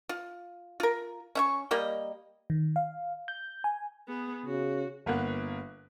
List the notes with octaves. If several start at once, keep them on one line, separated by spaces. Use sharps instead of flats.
F4
F4 A#4
C#4 E5 C#6
G3 A#3 D#5
D#3
F5
G6
G#5
B3 G#4
C#3 F#4
G1 A#3 B3 F#6